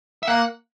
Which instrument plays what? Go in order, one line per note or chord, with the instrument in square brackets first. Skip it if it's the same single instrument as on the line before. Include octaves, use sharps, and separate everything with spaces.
[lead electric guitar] E5
[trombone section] A#3 [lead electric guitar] F#5